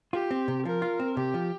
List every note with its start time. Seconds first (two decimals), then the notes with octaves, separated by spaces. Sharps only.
0.13 F4 G4
0.31 C4
0.48 C3
0.65 F3 A#4
0.82 F4
1.00 C4
1.17 C3 G4
1.34 F3